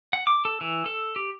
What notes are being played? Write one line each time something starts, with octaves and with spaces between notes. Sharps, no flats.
F#5
D6
A4
E3
A4
G4